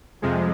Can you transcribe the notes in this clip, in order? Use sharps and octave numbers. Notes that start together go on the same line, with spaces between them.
F2 C3 F3 G3 G#3